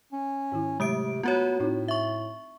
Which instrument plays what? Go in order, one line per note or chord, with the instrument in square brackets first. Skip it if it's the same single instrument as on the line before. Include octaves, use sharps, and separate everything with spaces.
[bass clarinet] C#4
[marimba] G#2 D#3 E4
[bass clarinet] C3 [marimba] F#3 A3 E5 [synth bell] G#3 D#6 D7
[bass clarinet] B3 [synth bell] F4 F#4 C#5
[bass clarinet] A2 [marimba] C4 D#4 E4
[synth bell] E5 C#6